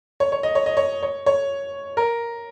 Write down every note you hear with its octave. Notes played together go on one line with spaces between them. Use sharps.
C#5
C#5
D#5
C#5
D#5
C#5
C#5
C#5
A#4